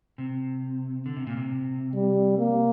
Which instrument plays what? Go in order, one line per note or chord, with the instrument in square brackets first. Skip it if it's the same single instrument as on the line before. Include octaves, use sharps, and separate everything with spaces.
[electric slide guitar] C3
D3
C3
A#2
C3
[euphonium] G3
A#3